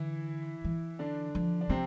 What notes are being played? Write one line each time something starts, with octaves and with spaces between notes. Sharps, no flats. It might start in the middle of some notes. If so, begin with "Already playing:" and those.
Already playing: D3 E3 E4
E3
D3 D4
F3
D4
C3 F3 C4